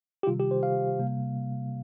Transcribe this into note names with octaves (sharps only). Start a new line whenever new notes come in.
G4
C3 D#3 G3 F4
G4
C5
F5
C3 G3 A#3